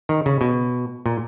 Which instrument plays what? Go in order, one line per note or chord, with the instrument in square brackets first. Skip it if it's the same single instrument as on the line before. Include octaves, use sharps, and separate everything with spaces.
[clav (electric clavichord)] D#3
C#3
B2
A#2